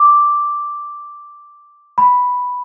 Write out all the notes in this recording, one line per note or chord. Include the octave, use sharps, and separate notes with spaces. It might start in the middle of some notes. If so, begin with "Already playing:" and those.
Already playing: D6
B5